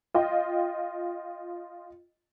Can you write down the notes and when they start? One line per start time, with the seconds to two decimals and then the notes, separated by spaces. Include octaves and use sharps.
0.14 F4 D#5 G5